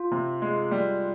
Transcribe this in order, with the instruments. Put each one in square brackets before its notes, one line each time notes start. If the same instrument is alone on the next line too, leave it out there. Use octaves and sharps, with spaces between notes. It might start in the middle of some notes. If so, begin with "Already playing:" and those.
Already playing: [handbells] F4
[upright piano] C3
G#3
G3